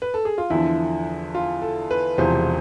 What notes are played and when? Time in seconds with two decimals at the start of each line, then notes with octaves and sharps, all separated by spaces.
0.02 B4
0.14 A4
0.25 G#4
0.38 F4
0.50 E2 D3 F3 E4
1.35 F4
1.62 A4
1.91 B4
2.18 E1 E2 C3 F3 C5